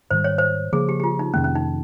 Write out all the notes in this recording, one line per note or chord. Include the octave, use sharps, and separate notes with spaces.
G#2 D#3 G3 C5
C#5
C5
C#3 F3 A#3 G#4
G4
G4
F4
D#4
F2 C3 D#3 A#3 C#4
C#4
D#4